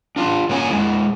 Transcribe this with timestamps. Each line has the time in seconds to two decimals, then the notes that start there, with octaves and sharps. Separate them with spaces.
0.16 D4 F4
0.49 C#3 F3 A#3 C#5 F#5 G#5
0.71 G#3 E4